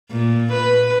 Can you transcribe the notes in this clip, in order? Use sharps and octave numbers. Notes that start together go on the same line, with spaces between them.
A#2
B4